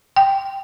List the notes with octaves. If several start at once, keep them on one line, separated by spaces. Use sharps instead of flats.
G5